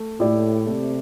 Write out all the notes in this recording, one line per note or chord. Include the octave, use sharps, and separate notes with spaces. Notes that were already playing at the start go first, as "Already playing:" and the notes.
Already playing: A3
A2 E4 G4 D5
C3 A3